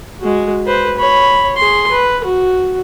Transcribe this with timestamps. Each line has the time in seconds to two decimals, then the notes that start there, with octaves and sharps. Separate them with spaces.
0.20 G#3 F#4
0.67 B4 C5
0.98 C#5 B5
1.57 G#4 C6
1.92 B4
2.24 F#4